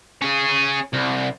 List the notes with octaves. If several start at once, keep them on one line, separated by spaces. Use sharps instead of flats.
C#4 G#4
C2